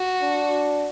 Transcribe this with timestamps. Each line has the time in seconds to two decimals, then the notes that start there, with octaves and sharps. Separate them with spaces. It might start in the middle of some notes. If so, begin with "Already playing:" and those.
Already playing: F#4
0.22 D4